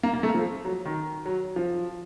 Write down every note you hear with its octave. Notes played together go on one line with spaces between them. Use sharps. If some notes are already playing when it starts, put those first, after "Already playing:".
A#3
A#3
A3
F3
F#3
D#3
F#3
F3